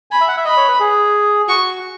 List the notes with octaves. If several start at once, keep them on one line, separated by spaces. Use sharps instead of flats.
G#5 B5
E5
F#5
E5
D#5 B5
C#5
B4
G#4
F#4 C#6